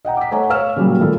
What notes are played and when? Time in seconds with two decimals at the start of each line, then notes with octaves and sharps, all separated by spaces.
0.05 D#5 F#5 G5 A#5
0.17 D6 B6
0.31 A3 C#5 F#5 G#5 A#5
0.50 C#5 F5 E6 F6 E7
0.76 A#2 C#3 F#3 G3
0.99 G#1 A2 A#3 F4 A4